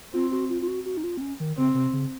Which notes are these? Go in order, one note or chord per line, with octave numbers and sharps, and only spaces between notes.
C4 F4
F#4
F4
F4
F#4
F#4
D#4
F4
C4
C#4
D#3
C#3 C4
C3
C#3